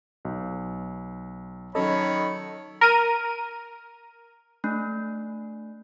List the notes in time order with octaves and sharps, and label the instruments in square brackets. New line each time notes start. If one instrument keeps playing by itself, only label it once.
[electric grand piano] B1
[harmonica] D#3 C#5 B5 [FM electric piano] F#3 C#4 D#5 [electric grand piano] A4
[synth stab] A#4 D#7
[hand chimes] A3 D4